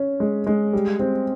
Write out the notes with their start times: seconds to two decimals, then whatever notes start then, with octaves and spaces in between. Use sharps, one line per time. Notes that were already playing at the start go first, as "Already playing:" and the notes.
Already playing: C#4
0.20 G#3
0.47 G#3
0.73 G3
1.00 C4